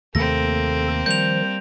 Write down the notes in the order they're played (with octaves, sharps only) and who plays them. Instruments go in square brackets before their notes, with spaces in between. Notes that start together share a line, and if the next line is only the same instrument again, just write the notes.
[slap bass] D#2 C3 A3 [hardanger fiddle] A#3 C4 [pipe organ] A4 [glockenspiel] A#6
[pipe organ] D#3 F3 C5 [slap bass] G3 [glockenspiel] G6 F7